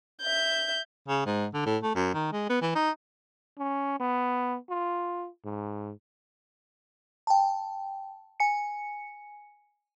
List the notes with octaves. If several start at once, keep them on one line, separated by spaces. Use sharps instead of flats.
E5 G6
C#3
G#2
D3
A2
A3
F#2
D#3
G#3
B3
E3
D#4
C#4
B3
F4
G#2
G5 A5
G#5 C#7